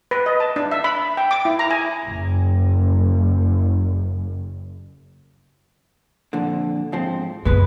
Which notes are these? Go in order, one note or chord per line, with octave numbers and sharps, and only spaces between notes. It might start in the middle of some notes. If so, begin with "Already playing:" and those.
B4
D#5
A5
D4
E5
B5
G5
D6
E4
A#5
G#5
F#1 F#2
F2 A#2 D3
G#2 F3 C4
F#2 C#3 G#3 B3 B4